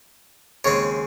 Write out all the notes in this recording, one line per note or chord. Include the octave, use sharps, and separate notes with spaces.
D#2 C#3 G#3 C4 C#5